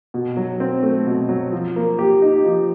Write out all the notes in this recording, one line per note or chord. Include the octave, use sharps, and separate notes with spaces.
B2
F#3
C4
A3
B2
F#3
F3
A#3
G4
D#4
F3